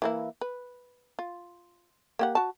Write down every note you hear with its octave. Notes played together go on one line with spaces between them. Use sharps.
E3 A#3 E4
B4
F4
A#3 G4 F#5
F#4 A5